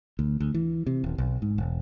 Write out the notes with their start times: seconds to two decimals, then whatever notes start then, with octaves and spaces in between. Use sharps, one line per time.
0.19 D2
0.40 D2
0.54 E3
0.87 C3
1.04 D#1
1.18 B1
1.42 G#2
1.58 E1